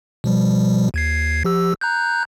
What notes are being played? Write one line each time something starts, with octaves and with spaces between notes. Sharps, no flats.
B2 F3 G3
D#2 G#6 C7
F3 G4 E6
A#5 F#6 G6